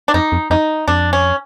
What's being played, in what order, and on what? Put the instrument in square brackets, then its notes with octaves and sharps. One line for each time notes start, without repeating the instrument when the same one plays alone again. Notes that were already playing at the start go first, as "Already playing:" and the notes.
[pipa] D4
[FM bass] F2 [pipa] D#4
[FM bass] F2
[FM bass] F2 [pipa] D#4
[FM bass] F2 [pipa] D4
[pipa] C#4